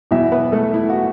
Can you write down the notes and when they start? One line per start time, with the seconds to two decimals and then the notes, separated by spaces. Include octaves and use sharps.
0.11 E2 B2 F#3 E4 E5
0.32 B3 B4
0.52 A3 A4
0.74 E4
0.90 F#4